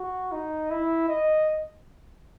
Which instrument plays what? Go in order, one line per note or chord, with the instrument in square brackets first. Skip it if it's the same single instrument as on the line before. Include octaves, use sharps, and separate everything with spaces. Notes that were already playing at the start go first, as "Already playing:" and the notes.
Already playing: [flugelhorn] F#4
D#4
E4
D#5